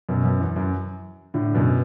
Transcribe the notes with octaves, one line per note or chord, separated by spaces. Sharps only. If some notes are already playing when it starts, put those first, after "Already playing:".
F#2 B2
F#2
E2
F#2
A2 D3
F#2 B2